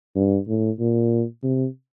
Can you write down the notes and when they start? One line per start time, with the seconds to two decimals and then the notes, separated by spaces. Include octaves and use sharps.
0.16 G2
0.48 A2
0.79 A#2
1.43 C3